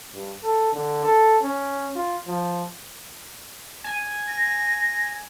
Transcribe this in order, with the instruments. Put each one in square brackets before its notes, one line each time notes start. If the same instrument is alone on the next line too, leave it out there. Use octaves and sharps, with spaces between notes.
[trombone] G2
A4
D3
A4
C#4
F4
F3
[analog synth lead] G#5
[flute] A#6